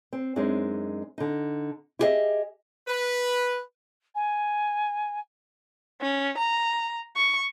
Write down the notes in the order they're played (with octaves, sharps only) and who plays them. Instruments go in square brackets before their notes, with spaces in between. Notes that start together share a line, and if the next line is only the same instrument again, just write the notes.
[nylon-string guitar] C4
F#2 G#3 C4 D4 D#4
D3 D#4
E4 G4 G#4 A#4 D#5 E5
[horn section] B4
[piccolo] G#5
[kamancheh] C#4
A#5
C#6